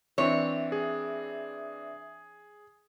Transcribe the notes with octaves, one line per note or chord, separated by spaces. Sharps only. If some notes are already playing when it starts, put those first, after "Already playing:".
E3 C4 D4 C#5 E5
G#4